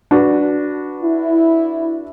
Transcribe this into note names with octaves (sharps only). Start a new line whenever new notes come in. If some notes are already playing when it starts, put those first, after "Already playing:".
D4 F#4 B4
E4